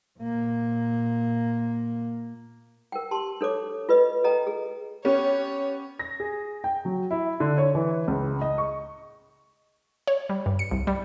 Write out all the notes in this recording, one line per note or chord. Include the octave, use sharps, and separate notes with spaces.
A#2 A#3
A#4 G5
G4 A5 C6
D4 A4 C#5 D6
F4 B4 D#5
A4 D#5 G5 A#5
G#4
B3 C#4 G4 C#5
A#6
G#4
G5
F#3
E4
D3
C#5
E3
C#2
D#5
C#6
C#5
G3
G2
C#7
C2
G3